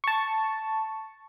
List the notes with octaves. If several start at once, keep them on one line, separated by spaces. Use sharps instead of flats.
A5 C#6